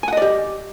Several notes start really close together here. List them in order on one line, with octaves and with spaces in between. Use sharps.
G#5 F#5 D#5 D5 G4